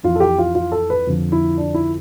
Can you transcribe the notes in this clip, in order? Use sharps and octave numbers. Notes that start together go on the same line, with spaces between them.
F2 E3 F4
A4
G4
F4
F4
A4
B4
F2 D3 F3
E4
D4
E4